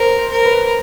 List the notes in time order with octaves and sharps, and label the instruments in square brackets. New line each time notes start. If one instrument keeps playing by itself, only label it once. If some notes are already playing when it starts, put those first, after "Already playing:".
Already playing: [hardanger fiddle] A#4 [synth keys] C5
[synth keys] C5
[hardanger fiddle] A#4
[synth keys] B4